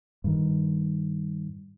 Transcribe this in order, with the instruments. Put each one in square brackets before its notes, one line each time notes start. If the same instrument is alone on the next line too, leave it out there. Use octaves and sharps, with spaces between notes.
[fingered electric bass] G2 D#3